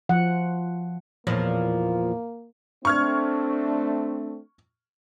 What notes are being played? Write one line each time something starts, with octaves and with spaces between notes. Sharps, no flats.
F3 F#5
E2 A#2 F3 A#3
A3 C4 D4 C#6 F6 G#6